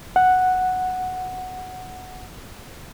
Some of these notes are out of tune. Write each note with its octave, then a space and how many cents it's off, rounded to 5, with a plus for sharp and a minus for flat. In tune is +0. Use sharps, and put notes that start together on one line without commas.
F#5 +0